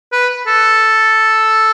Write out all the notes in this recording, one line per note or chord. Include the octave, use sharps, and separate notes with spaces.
B4
A4